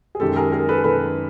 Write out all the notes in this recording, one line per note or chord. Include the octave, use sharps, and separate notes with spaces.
G#4
F#2 D#3 G#3 G4 A4
G#4 A#4
G#4 A#4
A4 B4
F#2 D#3 G#3 A4 B4